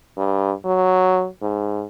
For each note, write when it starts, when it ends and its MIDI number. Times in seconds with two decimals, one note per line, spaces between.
0.17 0.52 43
0.65 1.27 54
1.42 1.85 44